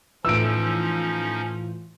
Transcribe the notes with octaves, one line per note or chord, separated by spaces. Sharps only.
A2 E3 F3 C#4 D#4 F4 E6 D7